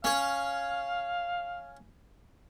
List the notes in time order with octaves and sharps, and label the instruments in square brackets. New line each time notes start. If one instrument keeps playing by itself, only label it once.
[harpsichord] C#4 C#5 [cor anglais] F5